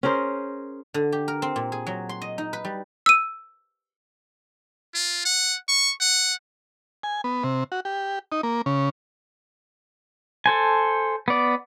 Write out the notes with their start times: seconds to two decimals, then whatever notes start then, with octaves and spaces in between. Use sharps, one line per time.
0.03 C#4 G#4 A#4 C5
0.94 D3
1.12 G4
1.28 A#4
1.42 C4
1.56 A#2
1.72 G#4
1.87 F#3
2.09 C6
2.22 D#5
2.38 D#4
2.53 B4
2.65 G3
3.06 E6 D#7
4.95 F4
5.26 F#5
5.68 C#6
6.01 F#5
7.03 G#5
7.24 B3
7.44 C3
7.72 F#4
7.85 G4
8.32 D#4
8.43 A#3
8.66 C#3
10.46 A4 C5 G#5
11.28 B3 D5